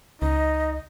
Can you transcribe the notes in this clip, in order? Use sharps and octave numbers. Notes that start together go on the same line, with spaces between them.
C#2 D#4 D#5